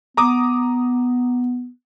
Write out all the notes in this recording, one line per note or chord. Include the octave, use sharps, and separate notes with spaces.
B3 A#5 D6 D#6